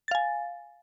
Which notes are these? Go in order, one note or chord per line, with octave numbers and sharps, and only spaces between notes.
F5 G#5 A6